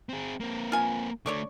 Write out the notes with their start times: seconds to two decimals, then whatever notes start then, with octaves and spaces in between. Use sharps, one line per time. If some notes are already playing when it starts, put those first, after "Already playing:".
0.09 C4 G#4
0.40 A#3 C4
0.72 F4 G#5
1.26 D3 A3 C#5 D5 C#6